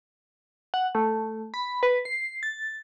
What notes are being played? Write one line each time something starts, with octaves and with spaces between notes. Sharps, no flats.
F#5
A3
B5
B4
C7
A6